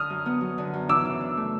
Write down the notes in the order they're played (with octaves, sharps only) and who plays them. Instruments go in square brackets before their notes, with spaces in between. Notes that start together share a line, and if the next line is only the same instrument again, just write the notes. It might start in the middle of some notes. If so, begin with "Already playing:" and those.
Already playing: [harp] D3 [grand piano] D#6 F6
[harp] F#2
B3
F#3
D3
F#2
[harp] E3 [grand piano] D6 E6
[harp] C#3
D4
A3